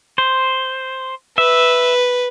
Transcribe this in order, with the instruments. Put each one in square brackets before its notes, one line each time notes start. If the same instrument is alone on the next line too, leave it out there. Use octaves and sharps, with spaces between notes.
[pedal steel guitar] C5
[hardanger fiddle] B4 [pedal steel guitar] E5